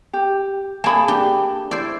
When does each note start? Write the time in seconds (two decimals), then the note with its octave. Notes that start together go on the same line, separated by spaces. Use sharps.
0.13 G4
0.84 A#3 G#4 A4 A5 B5
1.08 D4 G4
1.71 E4 C5 D5